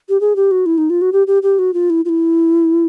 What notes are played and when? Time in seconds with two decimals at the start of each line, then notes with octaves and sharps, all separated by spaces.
0.09 G4
0.21 G#4
0.36 G4
0.51 F#4
0.66 E4
0.78 D#4
0.90 F4
1.01 F#4
1.12 G4
1.27 G4
1.43 G4
1.59 F#4
1.74 F4
1.90 E4
2.05 F4
2.09 E4